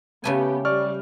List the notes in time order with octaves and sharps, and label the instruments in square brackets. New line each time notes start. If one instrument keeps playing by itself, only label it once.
[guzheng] C#3 A3 G#5 [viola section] B3 G4
[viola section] G3 [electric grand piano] D5 C#6 F6